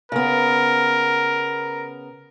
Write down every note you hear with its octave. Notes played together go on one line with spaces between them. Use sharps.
C#3 B3 A#4